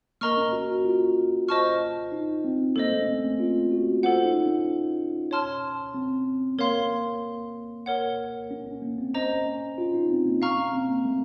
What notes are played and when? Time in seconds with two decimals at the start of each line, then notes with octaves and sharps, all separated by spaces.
0.21 A#3 A#4 D#5 A#5 C#6 F6
0.37 C#4
0.52 F#4
0.69 F#4
0.85 F4
1.48 C5 D#5 A5 C#6 F6
2.12 D#4
2.45 C4
2.76 A#3 A4 C5 D#5
2.92 A3
3.02 C#4
3.09 C4
3.25 C#4
3.40 F4
3.72 F#4
4.03 F4 A4 C5 F#5
4.25 D#4
4.46 C#4
5.31 C#5 A5 C6 F6
5.94 C4
6.58 A#3 A#4 C#5 F5 C6
6.91 A#3
7.86 A#4 C#5 F#5
8.51 C#4
8.66 C#4
8.82 A#3
8.98 C4
9.14 C#4 C5 D#5 A#5
9.46 C#4
9.78 F4
9.94 D#4
10.09 C4
10.26 A#3
10.42 F5 A#5 C#6 F6
10.57 C#4
10.73 C4
10.89 A#3
11.05 A3